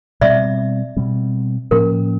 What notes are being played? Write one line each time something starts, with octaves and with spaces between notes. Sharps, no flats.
B2 G3 C4 D5 E5
B2 G3 C4
A2 F3 A#3 C#4 A#4